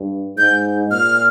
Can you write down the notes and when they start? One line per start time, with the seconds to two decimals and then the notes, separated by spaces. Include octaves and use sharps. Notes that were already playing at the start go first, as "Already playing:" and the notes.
Already playing: G2
0.37 G#2 G6
0.91 A#2 F6